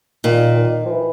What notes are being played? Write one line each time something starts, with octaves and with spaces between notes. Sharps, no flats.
A#2 D#3
D#3
F3
E3